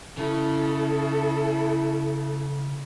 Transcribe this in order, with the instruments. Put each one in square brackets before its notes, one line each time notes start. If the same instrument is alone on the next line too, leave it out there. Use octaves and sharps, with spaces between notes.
[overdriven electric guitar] C#3 [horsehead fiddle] E4 A4